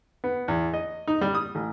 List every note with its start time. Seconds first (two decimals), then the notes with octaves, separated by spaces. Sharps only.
0.24 B3
0.48 E2
0.74 D#5
1.07 D#4
1.21 G3
1.35 D#6
1.55 A1